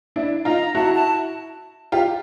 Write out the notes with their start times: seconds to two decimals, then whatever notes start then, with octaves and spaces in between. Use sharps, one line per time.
0.16 D4 E4
0.45 D#4 F4 A#5
0.75 E4 F#4 A5
0.95 A5
1.92 F4 G4